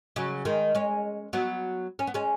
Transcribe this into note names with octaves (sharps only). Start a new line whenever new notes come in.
C#3 F#3
D#3 G#3
G#3 C#4
F#3 B3
C#4
B3
G#3 C#4